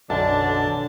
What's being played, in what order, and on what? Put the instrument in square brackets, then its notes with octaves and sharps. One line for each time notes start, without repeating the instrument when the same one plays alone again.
[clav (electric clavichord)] B1 F#2 [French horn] D3 [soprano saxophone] D4 [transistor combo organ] A5